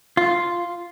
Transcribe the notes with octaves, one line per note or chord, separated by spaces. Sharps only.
F4